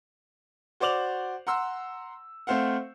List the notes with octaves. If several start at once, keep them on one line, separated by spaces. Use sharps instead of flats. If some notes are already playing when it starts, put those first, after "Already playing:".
F#4 C5 D5 D6 F7 F#7
F#5 A#5 C6 E6
A3 C4 C5 F5 F#5